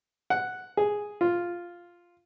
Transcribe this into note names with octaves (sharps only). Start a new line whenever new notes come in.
F#5
G#4
F4